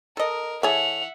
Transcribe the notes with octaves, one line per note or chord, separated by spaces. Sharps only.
A4 A#4 D#5
E3 G#4 A4 C#5 E5 F#5 F7